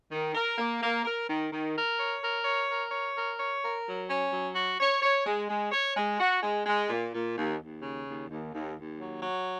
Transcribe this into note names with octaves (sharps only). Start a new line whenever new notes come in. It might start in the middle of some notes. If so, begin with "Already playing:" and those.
D#3
A#4
A#3
A#3
A#4
D#3
D#3
A#4
C#5
A#4
C#5
A#4
C#5
A#4
C#5
A#4
F#3
C#4
F#3
F#4
C#5
C#5
G#3
G#3
C#5
G#3
F#4
G#3
G#3
A#2
A#2
D#2
D#2
C#3
D#2
D#2
D#2
D#2
F#3
F#3